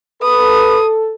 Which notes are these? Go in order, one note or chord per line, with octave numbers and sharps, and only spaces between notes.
A4 B4 D#6